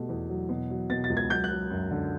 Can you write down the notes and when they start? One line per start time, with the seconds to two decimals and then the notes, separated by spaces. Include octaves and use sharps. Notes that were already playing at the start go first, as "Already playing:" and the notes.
Already playing: B2 G3 A3
0.09 E2
0.29 F#3
0.49 B2
0.70 F#3
0.90 B2 A6
1.04 A6
1.10 C#2
1.17 G#6
1.30 F#3 G6
1.44 F#6
1.51 F#3
1.70 F#2
1.91 D3